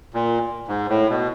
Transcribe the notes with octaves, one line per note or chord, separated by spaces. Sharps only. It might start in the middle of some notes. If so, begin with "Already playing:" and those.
A#2
G#2
A2
B2